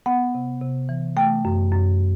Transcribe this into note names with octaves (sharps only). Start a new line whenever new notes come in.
B3 F#5
C3
C3
E3
A3 G5
F#2
F#2